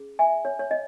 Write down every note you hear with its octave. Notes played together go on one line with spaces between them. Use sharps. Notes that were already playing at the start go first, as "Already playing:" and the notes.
Already playing: C#4 G#4
E5 G#5
C#5
C#5
D#5